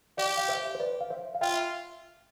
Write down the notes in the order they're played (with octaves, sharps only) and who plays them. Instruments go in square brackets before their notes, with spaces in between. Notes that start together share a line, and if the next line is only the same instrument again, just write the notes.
[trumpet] G4 [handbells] D5 F5
[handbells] F5
C5 E5
C5
B4 D5
F5
C5 E5
F5
[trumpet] F4 [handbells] E5 G5